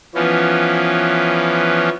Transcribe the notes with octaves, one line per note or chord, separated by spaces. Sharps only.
E3 F3 B3 C#4